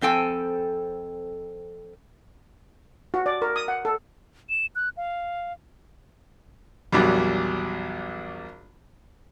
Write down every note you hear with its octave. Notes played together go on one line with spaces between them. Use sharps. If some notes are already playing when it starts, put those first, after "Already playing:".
F2 C4 A4 G5 G#5
F#4
D5
A#4
D#6
F#5
A4
E7
F#6
F5
A#1 E2 F#3 G3